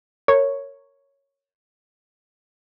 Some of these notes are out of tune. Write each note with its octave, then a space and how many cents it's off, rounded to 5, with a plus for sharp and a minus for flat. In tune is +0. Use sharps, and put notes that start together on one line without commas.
A#4 -20 C#5 +0